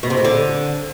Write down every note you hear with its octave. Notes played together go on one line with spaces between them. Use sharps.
B2
C3
A2
D3